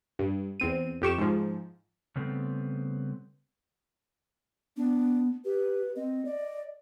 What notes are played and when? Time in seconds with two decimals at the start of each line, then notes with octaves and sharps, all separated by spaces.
0.19 G2
0.60 E2 C4 D#7
1.02 F2 G4 C#6 E7
1.18 G#2 F3
2.16 C#3 G3 A3 B3 C4
4.77 B3 D4
5.45 G4 B4
5.96 C4 D#5
6.25 D5